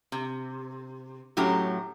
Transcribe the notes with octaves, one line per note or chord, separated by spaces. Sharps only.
C3
F#2 A2 F#3 G4